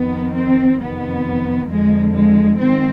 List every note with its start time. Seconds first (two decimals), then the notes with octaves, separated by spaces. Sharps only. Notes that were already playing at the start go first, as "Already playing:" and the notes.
Already playing: F2 D#3 B3
0.35 C4
0.80 F2 C3 D#3 B3
1.69 F2 D3 F3 G#3
2.14 G#3
2.59 G#2 D#3 C4